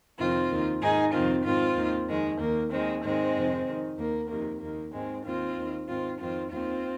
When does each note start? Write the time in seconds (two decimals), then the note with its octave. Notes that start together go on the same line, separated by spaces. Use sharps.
0.18 F2 C3 D#3 C4 F4
0.50 D#2 D#3
0.81 G#2 D#3 D#4 G#4
1.13 F2 C3 D#3 C4 F4
1.45 G#2 D#3 C4 F4
1.77 D#2 D#3
2.08 F2 D#3 G#3
2.39 D#2 D#3 A#3
2.71 D#2 D#3 G#3 C4
3.03 G#2 D#3 G#3 C4
3.35 F2 C3 D#3
3.66 F2 D#3
3.98 D#2 D#3 A#3
4.29 F2 C3 D#3 A#3
4.61 D#2 D#3 A#3
4.93 G#2 D#3 G#3 C4
5.24 D#2 D#3 C4 F4
5.57 D#2 D#3
5.88 G#2 D#3 C4 F4
6.19 F2 D#3 C4 F4
6.51 D#2 D#3 C4 F4